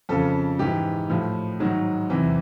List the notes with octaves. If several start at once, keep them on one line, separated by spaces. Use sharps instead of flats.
F2 C#3 F3 A4
G#2 E3 G4
A2 F3
G#2 D#3 F#3
E2 C3 E3